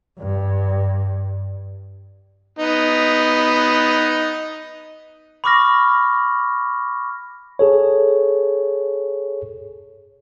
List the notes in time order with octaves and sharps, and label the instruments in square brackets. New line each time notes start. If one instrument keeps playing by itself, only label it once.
[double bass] G2
[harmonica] B3 D#4
[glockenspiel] B5 C#6 D6 F6 A#6
[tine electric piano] G#4 A4 C#5